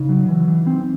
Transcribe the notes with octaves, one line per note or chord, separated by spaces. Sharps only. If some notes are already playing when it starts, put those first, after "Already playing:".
Already playing: C#3 D#4
F#3
E3
E3
C4